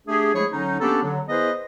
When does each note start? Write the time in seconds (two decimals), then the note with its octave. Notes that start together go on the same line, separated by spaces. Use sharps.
0.07 A3 D4 G4 G#4
0.34 F3 G#3 A3 E4 G#4 C#5
0.52 D3 F#3 C#4 D#4
0.80 A#3 B3 C#4 D4 G4 A4
1.03 D3 F#3
1.28 B3 E4 G#4 B4 C5 D#5